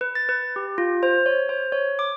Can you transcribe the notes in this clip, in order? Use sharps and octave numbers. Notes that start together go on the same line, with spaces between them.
B4
A6
B4
G4
F4
C5
C#5
C5
C#5
D6